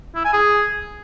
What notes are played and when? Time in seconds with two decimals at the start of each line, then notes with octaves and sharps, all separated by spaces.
0.16 E4
0.25 G#5
0.33 G#4